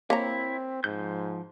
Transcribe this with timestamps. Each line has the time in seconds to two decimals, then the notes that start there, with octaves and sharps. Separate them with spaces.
0.10 A#3 C4 E4 C#5 A#5
0.84 G#2 F3 G6